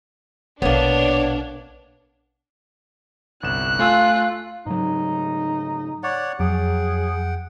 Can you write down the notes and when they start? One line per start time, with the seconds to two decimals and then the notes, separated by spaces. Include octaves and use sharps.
0.62 A#1 B2 A#3 B3 D4 C#5
3.43 G1 C2 F#6 E7
3.79 A3 F4 G#5 E6
4.66 G#2 C#3 F#3 D#4
6.03 C#5 D5 F#5
6.40 F2 F#3 G#4 F#5 G5